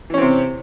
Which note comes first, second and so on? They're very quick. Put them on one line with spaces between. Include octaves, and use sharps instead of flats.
E3 C#4 C4 C3